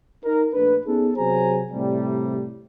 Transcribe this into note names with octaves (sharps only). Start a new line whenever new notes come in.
D#4 A#4
A#1 A3 D4 B4
B3 C#4 D#4 G#4 A4
C3 F#3 G#4 C5 G#5 A#5
A2 C3 G3